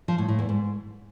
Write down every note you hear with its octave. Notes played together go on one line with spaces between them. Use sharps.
F3
A2
A2
E2
G#2